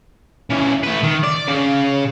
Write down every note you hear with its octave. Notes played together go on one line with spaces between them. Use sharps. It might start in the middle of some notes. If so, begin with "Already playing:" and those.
C#3 E3
A3 B4
D#3
D5
C#3